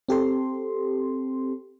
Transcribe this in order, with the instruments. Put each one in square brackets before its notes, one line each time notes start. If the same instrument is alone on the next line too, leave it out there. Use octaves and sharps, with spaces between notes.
[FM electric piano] C4 G4 A4 C6